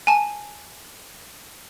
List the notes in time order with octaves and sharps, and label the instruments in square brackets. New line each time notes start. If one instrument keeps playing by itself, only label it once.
[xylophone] G#5 A5